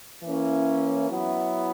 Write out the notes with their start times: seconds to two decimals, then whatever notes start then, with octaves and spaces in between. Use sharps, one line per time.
0.23 E3 A#3 C#4 E4
1.07 F#3 B3 E4